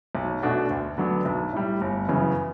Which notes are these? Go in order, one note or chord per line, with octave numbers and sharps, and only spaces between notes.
B1
B2 A3 D4 F#4
D2
D3 F#3 B3 D4
B1
A2 G3
G1
F#2 C#3 E3 B3